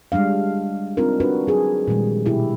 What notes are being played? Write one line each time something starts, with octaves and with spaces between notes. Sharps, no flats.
G3 G#3 D4 F5
C4 D4 D#4 F4 A#4
D4 F#4 B4
F#3 G#4
A#2 D#3 F3 G3 G#3
B2 E4 G4